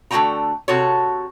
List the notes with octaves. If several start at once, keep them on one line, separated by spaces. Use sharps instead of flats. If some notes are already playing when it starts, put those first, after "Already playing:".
D3 A3 C#4 F#4 G5 A#5
C3 F#4 A4 C#5